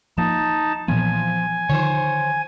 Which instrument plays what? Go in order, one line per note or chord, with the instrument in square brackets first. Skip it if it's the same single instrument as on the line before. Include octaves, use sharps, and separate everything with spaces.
[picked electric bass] F3 A#3 [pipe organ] D#4 A5
[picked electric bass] A#2 E3 B3 [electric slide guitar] F3 [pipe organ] G#5
[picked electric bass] D3 D#3 F3 [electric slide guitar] C5 C#5